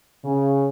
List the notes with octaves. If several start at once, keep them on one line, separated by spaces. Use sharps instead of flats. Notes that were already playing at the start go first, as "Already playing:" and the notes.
C#3